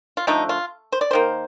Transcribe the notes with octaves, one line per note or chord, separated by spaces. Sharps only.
F4
D3 F3 A3 D#4
F4
C5
D5
D#3 A#3 C5